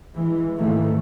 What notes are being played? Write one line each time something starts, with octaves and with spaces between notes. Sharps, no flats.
E3 G#3
G#2 D#3 E3 A3 A#3